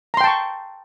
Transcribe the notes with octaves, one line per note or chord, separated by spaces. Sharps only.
G5 A5 A#5 C6 C#6